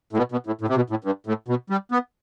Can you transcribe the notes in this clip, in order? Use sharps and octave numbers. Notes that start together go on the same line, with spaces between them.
A2
B2
B2
A2
A2
C3
B2
A2
G2
A2
B2
G3
B3